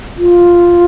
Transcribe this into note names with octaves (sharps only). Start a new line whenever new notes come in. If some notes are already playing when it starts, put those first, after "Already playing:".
F4